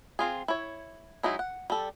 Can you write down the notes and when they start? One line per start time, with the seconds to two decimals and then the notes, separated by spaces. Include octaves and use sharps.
0.19 C4 F4 G#4
0.48 E4 C#5
1.23 F#3 G#3 D#4 E4
1.39 F#5
1.70 G3 A4